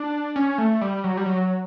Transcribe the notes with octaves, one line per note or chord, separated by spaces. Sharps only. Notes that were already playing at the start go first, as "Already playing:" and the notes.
Already playing: D4
C#4
A3
G3
F#3
G3
F#3